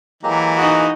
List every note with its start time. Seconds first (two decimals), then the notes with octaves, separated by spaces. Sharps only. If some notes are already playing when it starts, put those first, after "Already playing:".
0.23 E3 F#3 G#3 A#3 G4 A#5
0.57 D#4 F#4 G#4 F#5